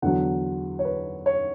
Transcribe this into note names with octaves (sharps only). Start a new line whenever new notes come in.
E2 D3 F#3 F#5
C#5
B4
C#5